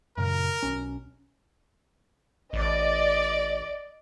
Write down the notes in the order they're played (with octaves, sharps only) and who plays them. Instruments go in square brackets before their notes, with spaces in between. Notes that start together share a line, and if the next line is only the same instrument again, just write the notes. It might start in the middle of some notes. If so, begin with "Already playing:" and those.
[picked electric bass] F#2 A#2 C#3 [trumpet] A#4
[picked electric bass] B1 C#4
[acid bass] A1 [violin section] D5 D#5